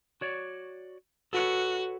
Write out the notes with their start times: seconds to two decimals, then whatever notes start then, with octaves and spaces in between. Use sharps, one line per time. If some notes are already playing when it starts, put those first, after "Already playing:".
0.21 F#4 C#5 D5
1.33 F#4 A4 B4 C#5